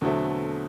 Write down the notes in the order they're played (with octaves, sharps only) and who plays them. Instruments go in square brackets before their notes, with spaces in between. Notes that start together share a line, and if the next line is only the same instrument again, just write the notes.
[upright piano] E2 B2 F#3 A3 C4 [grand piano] D3